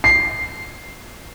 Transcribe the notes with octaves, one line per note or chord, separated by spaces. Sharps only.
C7